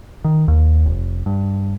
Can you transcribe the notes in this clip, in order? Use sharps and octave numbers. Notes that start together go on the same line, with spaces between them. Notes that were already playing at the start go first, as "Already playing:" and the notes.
D#3
D#2
F1
G2